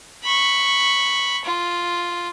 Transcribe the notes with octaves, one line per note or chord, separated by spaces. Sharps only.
B5 C#6
F4